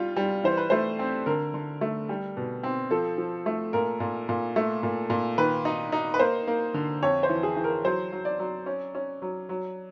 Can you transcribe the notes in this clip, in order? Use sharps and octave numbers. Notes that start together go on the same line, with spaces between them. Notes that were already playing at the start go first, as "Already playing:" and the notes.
Already playing: G3 F4
G3
E3 C5
B4
A3 C5
C4
D3 A#4
D3
A3
G3
B2
C4
F3 A4
F3
A3
A#2 A#4
A#2
A#2
A3
A#2
A#2
D#3 B4
D#4
D#4
B4
A#3 C5
A#3
D3
F2 C#5
C5
E3
G#4
E3
A#4
F#3 C5
F#3
D5
F#3
C#4
C#4
F#3
F#3